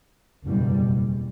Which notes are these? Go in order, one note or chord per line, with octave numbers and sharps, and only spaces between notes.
F#1 E2 B2 G3